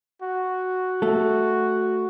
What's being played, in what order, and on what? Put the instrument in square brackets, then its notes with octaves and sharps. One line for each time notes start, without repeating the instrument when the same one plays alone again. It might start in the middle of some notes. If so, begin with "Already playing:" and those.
[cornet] F#4
[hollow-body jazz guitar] A3 A4